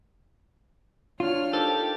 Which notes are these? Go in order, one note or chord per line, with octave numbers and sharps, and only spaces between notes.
D4 F4 C#5 F6
D#4 G4 A4 A#4 C5